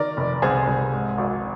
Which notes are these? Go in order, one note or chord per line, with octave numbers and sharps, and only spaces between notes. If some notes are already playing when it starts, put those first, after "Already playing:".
Already playing: D#3 A#4 D5
F1
C2 G#4 C5
C2
G#2
G#1